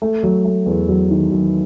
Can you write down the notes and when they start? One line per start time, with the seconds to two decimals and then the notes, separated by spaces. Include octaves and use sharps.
0.02 A3
0.23 F#3
0.44 A3
0.66 E2
0.88 F#3
1.10 D#3
1.31 F#3